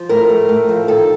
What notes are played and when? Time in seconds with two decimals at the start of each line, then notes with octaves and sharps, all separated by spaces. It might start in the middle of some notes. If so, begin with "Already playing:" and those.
Already playing: F3
0.09 A2 A#4
0.29 A3
0.49 A2
0.69 F3
0.88 D#3 A4